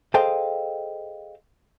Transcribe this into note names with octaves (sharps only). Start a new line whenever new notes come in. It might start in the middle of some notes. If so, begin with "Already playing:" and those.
G#4 A4 C5 D#5 F5 G5